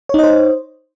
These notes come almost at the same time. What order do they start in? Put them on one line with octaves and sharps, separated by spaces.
C#5 D#4 D#5 C5